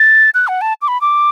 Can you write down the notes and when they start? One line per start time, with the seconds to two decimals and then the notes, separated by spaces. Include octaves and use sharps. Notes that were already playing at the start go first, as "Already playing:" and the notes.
Already playing: A6
0.34 F#6
0.48 F#5
0.61 A5
0.82 D6
0.88 B5
1.01 D6